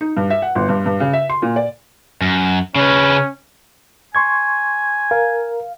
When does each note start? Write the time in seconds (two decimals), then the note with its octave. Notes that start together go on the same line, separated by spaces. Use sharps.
0.01 D#4
0.17 G2
0.30 E5
0.42 F#5
0.55 G1
0.69 G2
0.86 G2
1.00 C#3
1.13 E5
1.29 C6
1.42 A#2
1.56 D5
2.22 F#2
2.76 C#3 C#4 B4
4.15 G#5 C6 C#6 G#6
5.11 A#4 F5